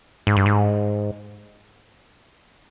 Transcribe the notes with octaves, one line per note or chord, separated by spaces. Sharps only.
G#2
G2
G#2